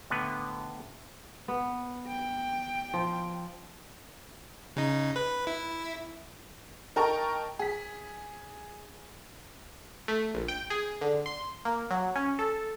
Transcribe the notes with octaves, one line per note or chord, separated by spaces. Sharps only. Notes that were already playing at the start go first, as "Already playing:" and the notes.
A2 D3 B3 B4
B3
G5
F3
C#3 D#4
B4
E4
D#4 A#4 G5 A5 A#5 C#6
G#4 B6
A3
A#1
G5
G#4
D3
C6
A#3
F#3
C#4
A4